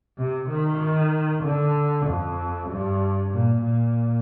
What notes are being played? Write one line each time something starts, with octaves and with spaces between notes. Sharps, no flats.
C3
D#3
D3
F2
G2
A#2
A#2